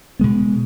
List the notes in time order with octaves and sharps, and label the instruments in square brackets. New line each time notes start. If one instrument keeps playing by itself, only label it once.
[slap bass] B2 G#3 B3